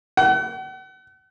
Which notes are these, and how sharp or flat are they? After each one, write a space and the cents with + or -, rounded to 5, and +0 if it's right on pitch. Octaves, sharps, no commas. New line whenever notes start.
F#5 +40